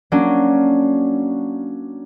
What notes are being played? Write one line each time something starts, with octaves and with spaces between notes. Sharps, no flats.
F#3 A#3 C#4 D4